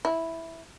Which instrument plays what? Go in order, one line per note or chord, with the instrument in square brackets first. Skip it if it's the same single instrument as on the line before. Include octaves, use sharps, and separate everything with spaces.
[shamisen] E4